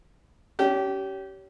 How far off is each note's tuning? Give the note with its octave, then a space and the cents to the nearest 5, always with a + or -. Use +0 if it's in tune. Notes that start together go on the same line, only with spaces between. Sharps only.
C#4 +25 G4 -25